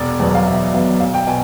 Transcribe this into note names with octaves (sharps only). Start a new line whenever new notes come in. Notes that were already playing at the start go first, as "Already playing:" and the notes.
Already playing: E1 D5
E2 B2 F#3 B3
F5
E1 E5
E2 B2 F#3 B3 F5
B1 F5
G5
B2 G#5